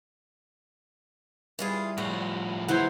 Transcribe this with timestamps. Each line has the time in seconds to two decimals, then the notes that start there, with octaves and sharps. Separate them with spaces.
1.59 E3 G3 F4 G#4
1.98 A2 F3 F#4
2.68 G#2 E3 F#3 E4 C5 F#5